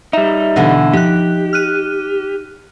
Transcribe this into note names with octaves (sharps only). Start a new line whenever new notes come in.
G3 D#4 E5
B2 D3 E3
F3 D#4 G4 F#6
F6 F#6 D#7